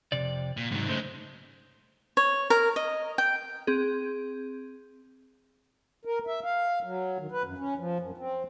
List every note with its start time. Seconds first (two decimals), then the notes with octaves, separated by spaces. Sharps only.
0.12 F2 C3 D5
0.57 A#2
0.72 G#2 C3 D#3 F#3
0.88 G2 C#3 G#3 A3 C5
2.17 C#5
2.50 A#4
2.76 D#5
3.18 G5
3.67 C4 G#4
6.05 A#4
6.27 E5
6.44 F5
6.83 F#3
7.19 D#3
7.32 B4
7.44 F#2
7.58 C#4
7.78 F3
8.00 F#2
8.18 C4